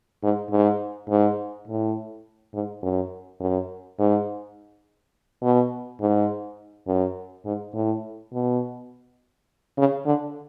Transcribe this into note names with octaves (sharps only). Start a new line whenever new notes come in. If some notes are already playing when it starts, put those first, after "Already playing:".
G#2
G#2
G#2
A2
G#2
F#2
F#2
G#2
B2
G#2
F#2
G#2
A2
B2
C#3
D3